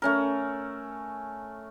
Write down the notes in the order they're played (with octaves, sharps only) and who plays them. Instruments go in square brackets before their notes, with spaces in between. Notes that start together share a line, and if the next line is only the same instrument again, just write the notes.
[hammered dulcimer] A3 C#4 A#4